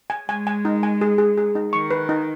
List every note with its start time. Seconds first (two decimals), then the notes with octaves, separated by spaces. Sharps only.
0.10 G#5
0.29 G#3 G#5
0.47 G#5
0.65 D#4
0.83 G#5
1.01 G#4
1.18 G#4
1.37 G#4
1.55 D#4
1.73 D#3 C#6
1.91 B4
2.09 D#4